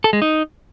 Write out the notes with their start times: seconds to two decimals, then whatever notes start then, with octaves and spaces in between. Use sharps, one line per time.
0.04 A4
0.13 G#3
0.22 D#4